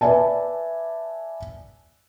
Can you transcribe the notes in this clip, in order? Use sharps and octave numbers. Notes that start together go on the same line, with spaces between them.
B4 D5 E5 G#5 A5